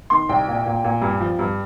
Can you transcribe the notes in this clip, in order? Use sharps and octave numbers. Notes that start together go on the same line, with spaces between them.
D#3 C6
C2 G5
A#2
A#2
A#2
G2
F3
G2